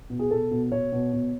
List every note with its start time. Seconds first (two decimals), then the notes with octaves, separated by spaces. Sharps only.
0.10 B2
0.19 G#4
0.31 B2 A4
0.51 B2
0.72 B2 C#5
0.92 B2
1.13 B2